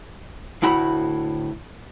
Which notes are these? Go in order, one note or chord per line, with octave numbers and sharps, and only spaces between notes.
D2 A2 E4 F#4 B5